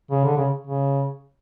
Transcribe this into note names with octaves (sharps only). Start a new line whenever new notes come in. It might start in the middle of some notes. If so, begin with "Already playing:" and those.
C#3
D3
C#3
C#3